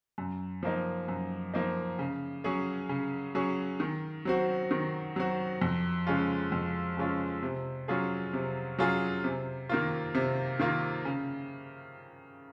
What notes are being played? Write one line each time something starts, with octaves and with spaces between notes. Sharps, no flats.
F#2
F3 A#3 D#4
F#2
F3 A#3 D#4
C#3
F#3 C#4 G#4
C#3
F#3 C#4 G#4
D#3
F#3 C4 F#4
D#3
F#3 C4 F#4
F2
C#3 G#3 C#4 F4
F2
C#3 G#3 C#4 F4
C3
F#3 C#4 F4 G#4
C3
F#3 C#4 F4 G#4
C3
D#3 A#3 F4
C3
D#3 A#3 F4
C#3